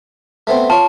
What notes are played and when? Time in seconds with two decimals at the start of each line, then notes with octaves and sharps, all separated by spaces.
0.47 A3 B3 C4
0.70 F4 C#5 A5